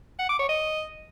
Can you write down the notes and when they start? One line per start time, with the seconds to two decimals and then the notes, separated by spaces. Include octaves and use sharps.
0.19 F#5
0.29 D6
0.39 C#5
0.49 D#5